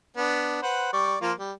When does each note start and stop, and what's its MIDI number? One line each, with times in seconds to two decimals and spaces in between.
0.17 0.59 59
0.17 0.59 62
0.63 0.89 71
0.63 0.89 72
0.63 0.89 78
0.93 1.16 55
0.93 1.16 74
0.93 1.16 85
1.21 1.32 53
1.21 1.32 58
1.21 1.32 65
1.39 1.52 55